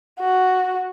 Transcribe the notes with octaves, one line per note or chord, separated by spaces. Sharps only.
F#4